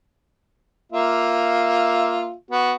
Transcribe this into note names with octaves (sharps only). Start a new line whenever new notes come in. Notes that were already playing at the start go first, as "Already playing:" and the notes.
A#3 F4 E5
B3 F#4